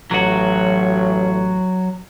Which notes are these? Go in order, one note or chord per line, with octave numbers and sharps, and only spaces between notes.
A1 F#3 F#4